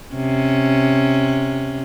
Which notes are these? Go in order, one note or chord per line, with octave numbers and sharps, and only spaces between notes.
C3 C#4